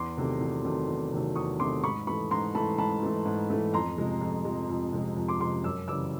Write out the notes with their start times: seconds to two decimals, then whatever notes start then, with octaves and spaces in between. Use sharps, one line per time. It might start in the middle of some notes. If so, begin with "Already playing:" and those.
Already playing: E2 C6 D6
0.17 C3 D#3 F#3 A3
0.41 E2
0.64 C3 D#3 F#3 A3
0.88 E2
1.12 C3 D#3 F#3 A3
1.36 E2 C#6 D#6
1.60 C3 D#3 F#3 A3 C6 D6
1.83 G#2 B5 C#6
2.07 E3 A3 B5 C#6
2.31 G#2 A#5 C6
2.55 E3 A3 A5 B5
2.78 G#2 A5 B5
3.02 E3 A3
3.26 G#2
3.50 E3 A3
3.74 F2 A#5 C6
3.98 C3 F3 G#3
4.21 F2
4.45 C3 F3 G#3
4.69 F2
4.92 C3 F3 G#3
5.17 F2
5.28 C6 D6
5.40 C3 F3 G#3 C6 D6
5.64 F#2 D6 E6
5.88 C#3 E3 G3 D6 E6